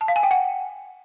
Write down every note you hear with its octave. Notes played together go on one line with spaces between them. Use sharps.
A5
F5
G#5
G5
F#5